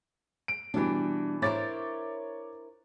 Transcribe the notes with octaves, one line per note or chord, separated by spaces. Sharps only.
D7
B2 E3 G3 D4
E4 A#4 C5 C#5 D6 A6